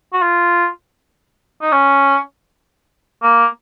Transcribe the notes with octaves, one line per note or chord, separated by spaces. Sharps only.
F#4
F4
D#4
C#4
A#3